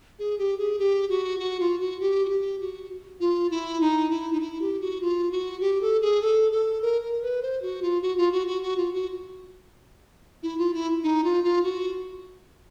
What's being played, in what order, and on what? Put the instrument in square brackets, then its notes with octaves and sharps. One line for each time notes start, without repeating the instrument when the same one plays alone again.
[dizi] G#4
G4
G#4
G4
F#4
F#4
F4
F#4
G4
F#4
G4
F#4
F4
E4
D#4
E4
D#4
E4
G4
F#4
F4
F#4
G4
A4
G#4
A4
A4
A#4
A#4
B4
C5
F#4
F4
F#4
F4
F#4
F#4
F#4
F4
F#4
E4
F4
E4
D#4
F4
F4
F#4